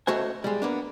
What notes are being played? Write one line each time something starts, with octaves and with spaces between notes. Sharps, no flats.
C#2 A3 F#4 C5 G#5
G3 G#3
A#3 B3 D4